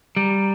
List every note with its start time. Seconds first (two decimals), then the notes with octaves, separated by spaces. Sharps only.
0.16 G3 A#5